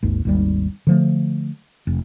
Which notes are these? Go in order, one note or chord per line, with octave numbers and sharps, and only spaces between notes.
G#1 D#2
G#1 D#2 G3
D3 F3 A3
F1